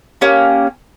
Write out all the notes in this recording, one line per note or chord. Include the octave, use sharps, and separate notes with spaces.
A#3 C#4 G4